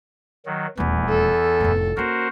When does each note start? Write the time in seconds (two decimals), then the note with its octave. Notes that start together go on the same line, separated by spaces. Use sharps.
0.46 D#3 F#3
0.77 D#1 E2 E3 A3
1.09 A4
1.60 F1 A2
1.97 A#3 C#4 F#4 A#4 C5